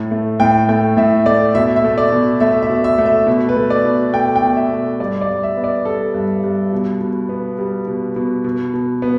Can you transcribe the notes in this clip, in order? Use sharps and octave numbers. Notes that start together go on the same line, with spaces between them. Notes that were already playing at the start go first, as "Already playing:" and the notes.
Already playing: A2
A3
A2 G5
A3 G5
A2 E5
A3 D5
B2 E5
E5
A3
D5
B2
A3 E5
E5
B2
E5
A3
E5
B2
B4
A3
D5
B2
A3 G5
G5
B2
E5
A3
G2 D5
D5
G2
E5
B3
D5
G3 A4
G2
G2
B2
B2
B3
G3
B2
B2
B2
B2
B3